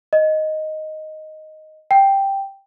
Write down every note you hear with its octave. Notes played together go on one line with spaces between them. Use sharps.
D#5
G5